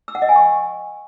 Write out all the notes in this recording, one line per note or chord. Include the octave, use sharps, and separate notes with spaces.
E6
F#5
D#5
G#5
C#6